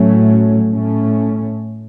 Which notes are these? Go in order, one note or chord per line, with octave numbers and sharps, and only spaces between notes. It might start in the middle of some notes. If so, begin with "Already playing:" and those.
Already playing: A2 F#3 A3 C#4
A2 A3 C#4